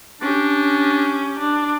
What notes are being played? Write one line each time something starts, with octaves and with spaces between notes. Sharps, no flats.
C#4 D4 G4
D4